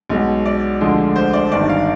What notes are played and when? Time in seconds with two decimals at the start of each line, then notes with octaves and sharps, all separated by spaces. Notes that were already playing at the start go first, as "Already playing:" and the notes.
0.09 B1 B2 G#3
0.46 D5
0.81 D2 D3 F3 G#3
1.16 C5
1.33 D5
1.52 G1 G2 D#3 D5
1.69 F5